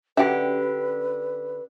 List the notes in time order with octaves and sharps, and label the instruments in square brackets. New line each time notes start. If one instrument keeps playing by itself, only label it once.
[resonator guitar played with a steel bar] D3 G4 [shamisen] F#3 F#4 E5 [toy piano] C#4 G5 [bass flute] B4